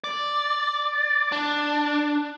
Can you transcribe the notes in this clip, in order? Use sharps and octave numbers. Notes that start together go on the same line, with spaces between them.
D5
D4